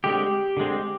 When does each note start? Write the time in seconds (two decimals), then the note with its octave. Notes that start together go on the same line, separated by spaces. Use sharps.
0.04 D3 G#3 C4 G4
0.57 D3 G#3 C4